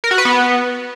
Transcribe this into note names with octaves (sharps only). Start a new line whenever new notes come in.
A#4
F#4
B4
B3